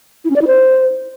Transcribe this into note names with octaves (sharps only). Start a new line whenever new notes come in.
E4
C#4
D5
E4
C5